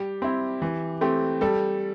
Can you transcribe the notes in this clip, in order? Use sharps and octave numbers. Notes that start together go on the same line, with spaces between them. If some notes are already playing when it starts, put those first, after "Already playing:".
Already playing: G3 G4
C4 E4
E3
A3 C4 G4
G3 A4